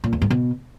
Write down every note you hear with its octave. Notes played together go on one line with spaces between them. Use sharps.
A#2
E2
G#2
B2